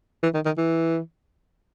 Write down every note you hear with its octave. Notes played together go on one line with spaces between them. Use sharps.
E3
D#3
D#3
E3